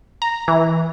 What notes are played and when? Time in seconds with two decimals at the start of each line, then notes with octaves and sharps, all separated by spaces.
0.22 A#5
0.48 E3